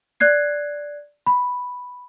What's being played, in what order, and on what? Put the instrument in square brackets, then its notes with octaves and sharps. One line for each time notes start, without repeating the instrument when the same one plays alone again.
[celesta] D5 F#6 G#6 C7
B5